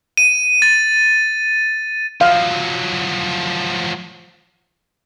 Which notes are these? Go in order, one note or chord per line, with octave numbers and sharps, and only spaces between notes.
D#7
A6
F3 F#3 F5